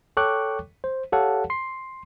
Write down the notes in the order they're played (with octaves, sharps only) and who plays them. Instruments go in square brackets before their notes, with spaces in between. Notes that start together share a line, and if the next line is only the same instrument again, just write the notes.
[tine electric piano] A4 C#5 G5 C#6 D6 F#6
C5
G4 A4 C#5 F5 F#5 A5
C6 C7